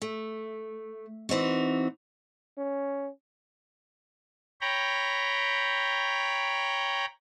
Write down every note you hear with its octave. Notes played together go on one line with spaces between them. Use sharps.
A3
E3 C4 D#4 F#4
C#4
C#5 G5 A#5 B5